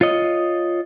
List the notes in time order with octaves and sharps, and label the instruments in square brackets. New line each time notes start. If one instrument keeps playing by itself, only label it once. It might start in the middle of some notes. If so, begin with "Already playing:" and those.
[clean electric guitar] F4 C#5 D#5